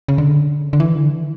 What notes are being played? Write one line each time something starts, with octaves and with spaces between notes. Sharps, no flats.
C#3
D3
D3
E3
D3
E3